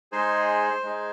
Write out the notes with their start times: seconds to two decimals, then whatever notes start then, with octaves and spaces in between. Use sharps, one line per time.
0.12 G#3 D#4 G#4 C5
0.83 G#3 D#4 G#4